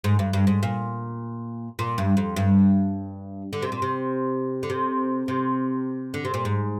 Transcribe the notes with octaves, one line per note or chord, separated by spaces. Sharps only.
G#2
G2
G2
G#2
A#2
A#2
G2
F2
G2
D3
C3
A#2
C3
D3
C3
C3
D3
C3
A#2
G#2